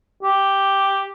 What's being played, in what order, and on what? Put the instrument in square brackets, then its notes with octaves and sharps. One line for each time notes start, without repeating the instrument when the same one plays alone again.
[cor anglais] G4